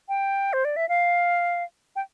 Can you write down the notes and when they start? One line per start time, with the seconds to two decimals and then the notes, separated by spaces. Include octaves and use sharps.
0.09 G5
0.53 C5
0.65 D5
0.76 E5
0.89 F5
1.96 G5